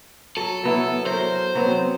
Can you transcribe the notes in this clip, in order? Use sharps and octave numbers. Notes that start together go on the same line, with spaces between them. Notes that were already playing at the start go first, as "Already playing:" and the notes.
F#3 A4
F#3 B3 E4
F#3 A#4 C5
F#3 B3 C4